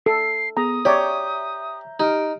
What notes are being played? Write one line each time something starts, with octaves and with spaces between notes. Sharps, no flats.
A4 C7
B3 G#4 A#5 D#6
G4 C#5 D5 E5 A#5 G6
D#4 G4 F6 D7